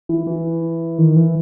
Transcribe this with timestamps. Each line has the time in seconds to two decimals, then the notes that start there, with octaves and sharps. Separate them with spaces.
0.09 E3
0.27 E3
0.98 D#3
1.16 E3